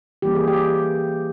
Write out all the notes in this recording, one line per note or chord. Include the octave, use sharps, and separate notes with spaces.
E3 G3 A#3 C#4 G4
G#4
G4